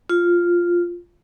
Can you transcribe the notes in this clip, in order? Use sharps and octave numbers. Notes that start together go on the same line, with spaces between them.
F4